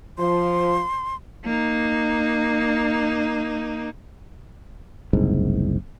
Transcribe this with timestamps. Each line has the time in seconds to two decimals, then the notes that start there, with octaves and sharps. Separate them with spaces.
0.18 F3 C6
1.45 A#3 D#4
5.13 F#1 C2 G#2